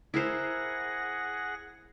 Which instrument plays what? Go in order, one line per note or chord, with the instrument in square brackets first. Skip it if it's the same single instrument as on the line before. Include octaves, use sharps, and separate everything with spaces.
[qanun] E4 A#4 C5 [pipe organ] G#4 F#5 A#6